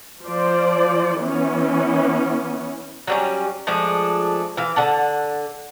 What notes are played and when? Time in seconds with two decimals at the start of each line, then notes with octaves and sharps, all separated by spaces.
0.25 F3 C5 D5
1.19 E3 B3 C#4
3.07 F#3 G3 C#4
3.67 F3 G#3 A3 D4
4.57 E3 F5
4.76 D3 F#5 A5